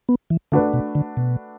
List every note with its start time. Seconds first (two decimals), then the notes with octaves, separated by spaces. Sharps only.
0.09 B3
0.30 E3
0.52 D3 A3 D4 F#4 B4
0.73 B2
0.95 D3
1.17 B2